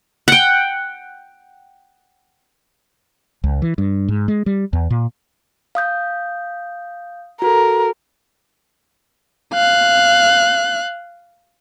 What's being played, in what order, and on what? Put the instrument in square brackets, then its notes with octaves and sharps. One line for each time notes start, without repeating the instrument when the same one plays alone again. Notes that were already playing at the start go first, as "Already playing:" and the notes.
[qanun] F#5 G5
[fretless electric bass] C#2
E3
G2
G#2
G#3
G3
E2
A#2
[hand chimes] F5 D#6 G6
[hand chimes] F#4 A4 [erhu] A#4
[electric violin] F5 F#6